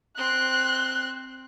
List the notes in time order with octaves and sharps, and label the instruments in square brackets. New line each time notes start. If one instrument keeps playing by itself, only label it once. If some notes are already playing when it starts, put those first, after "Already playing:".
[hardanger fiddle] C4 C6 [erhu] F#6